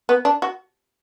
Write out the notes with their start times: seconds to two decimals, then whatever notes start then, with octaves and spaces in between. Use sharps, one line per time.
0.09 B3
0.25 D4
0.42 F#4